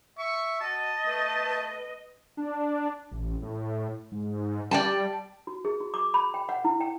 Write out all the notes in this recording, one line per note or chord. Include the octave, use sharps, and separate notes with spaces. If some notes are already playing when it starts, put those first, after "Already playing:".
E5 C#6
F#4 D#5 A5
A3 B4
B4
D4
A1
A2
G#2
G3 D5 G5 A5
F#4
G#4
F#4
D6
B5
G5
F#5
E4
G5